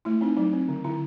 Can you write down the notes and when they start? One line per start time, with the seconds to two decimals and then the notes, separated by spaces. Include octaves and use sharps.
0.05 A3 E4
0.21 C4 D#4
0.37 F#3 D#4
0.53 C4
0.69 D3
0.84 D3 E4